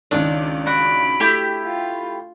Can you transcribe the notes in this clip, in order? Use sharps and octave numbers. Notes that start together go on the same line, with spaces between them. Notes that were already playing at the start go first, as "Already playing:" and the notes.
C#2 D#3 D4 D5
F#4 B5 D7
A3 E4 G4
F4